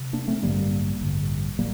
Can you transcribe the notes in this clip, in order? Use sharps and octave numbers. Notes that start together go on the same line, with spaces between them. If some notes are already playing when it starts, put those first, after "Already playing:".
Already playing: C3
A#3 D4
A3 C4
A1 G2 D3 G3 A#3
A1 G2 D3
A2 G3 A#3